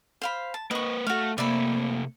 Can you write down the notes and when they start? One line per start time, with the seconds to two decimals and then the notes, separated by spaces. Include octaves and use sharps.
0.22 C5 F5 B5
0.54 A5
0.71 A#3 B4 D#5 C#6
1.07 A3 F#4 A4 F5
1.38 C3 A3 A#3 D5 E5 B5